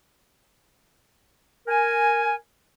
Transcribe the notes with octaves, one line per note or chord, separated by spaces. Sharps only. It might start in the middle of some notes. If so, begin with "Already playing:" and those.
A#4 G#5